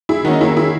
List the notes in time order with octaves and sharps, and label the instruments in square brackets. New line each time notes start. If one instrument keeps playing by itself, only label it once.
[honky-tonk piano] E4 G#4
[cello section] D#3 A#3 C#4 [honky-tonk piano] D#4 F#4
[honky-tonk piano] E4 G#4
E4 G#4